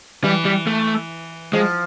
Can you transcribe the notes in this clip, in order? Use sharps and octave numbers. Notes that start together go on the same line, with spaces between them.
E3 G3
G3
A3
F3 G#3